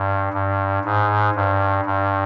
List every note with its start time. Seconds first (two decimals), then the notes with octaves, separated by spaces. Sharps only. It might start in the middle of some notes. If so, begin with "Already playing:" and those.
Already playing: G2
0.33 G2
0.85 G#2
1.35 G2
1.86 G2